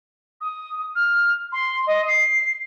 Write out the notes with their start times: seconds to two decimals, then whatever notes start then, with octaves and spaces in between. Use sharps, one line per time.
0.41 D#6
0.95 F6
1.52 C6
1.87 D#5
2.07 C7